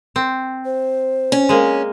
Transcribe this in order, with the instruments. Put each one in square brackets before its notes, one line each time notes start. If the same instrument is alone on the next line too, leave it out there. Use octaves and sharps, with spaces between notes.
[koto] C4
[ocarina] C5
[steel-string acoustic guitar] C#4
[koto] G#3 A#3